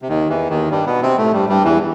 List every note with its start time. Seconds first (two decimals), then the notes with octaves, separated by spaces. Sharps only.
0.02 C3
0.08 D#2 D#3
0.29 E2 E3
0.50 D#2 D#3
0.71 G2 G3
0.86 B2 B3
1.02 C3 C4
1.18 A2 A3
1.33 G2 G3
1.49 G2 G3
1.65 E2 E3